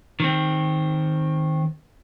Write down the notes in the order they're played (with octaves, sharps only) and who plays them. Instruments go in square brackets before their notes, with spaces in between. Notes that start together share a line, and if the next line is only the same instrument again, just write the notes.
[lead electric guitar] D#3 C4